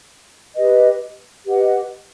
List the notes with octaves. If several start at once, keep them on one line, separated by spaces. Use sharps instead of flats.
G4 B4 D#5
G4 B4 D#5 F#5